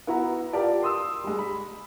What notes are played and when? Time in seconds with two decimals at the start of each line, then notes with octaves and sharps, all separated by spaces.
0.07 B3 E4 F#4 A#5
0.53 F4 G4 A#4 D5 A5
0.82 C6 D#6 E6
1.24 G3 G#3
1.39 B5